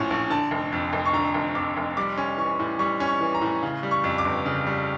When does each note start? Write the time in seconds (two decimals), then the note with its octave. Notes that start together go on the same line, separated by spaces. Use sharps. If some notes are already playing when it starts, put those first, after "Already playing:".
Already playing: A#1 A2 F3 C#4
0.10 A#1
0.30 D3 A5
0.51 F1
0.72 F2
0.93 F1
1.05 C#6
1.13 D3 A#5
1.34 F1
1.55 F2 D6
1.77 F1
1.97 G3 D6
2.17 C#4
2.38 E3 C#6
2.59 A2
2.79 G3 C#6
3.00 C#4
3.07 C#6
3.21 E3
3.35 A#5
3.41 A2
3.63 C#3
3.83 G3
3.91 C#6
4.04 F2
4.18 D6
4.25 G1
4.46 C#3
4.67 G3